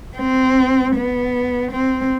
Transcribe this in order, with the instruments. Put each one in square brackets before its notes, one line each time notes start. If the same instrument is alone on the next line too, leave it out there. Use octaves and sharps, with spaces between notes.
[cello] C4
B3
C4